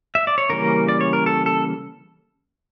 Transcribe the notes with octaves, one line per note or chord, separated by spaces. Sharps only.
E5
D5
C#5
C#3 E3 G3 A#3 C#4 A#4
D5
C#5
A#4
A4
A4